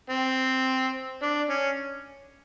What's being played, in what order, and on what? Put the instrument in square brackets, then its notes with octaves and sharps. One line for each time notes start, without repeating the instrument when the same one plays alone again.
[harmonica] C4
D4
C#4